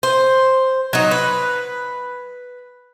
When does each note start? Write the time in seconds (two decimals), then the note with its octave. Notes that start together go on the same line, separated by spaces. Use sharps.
0.03 C5
0.93 F#3 D#4
1.11 B4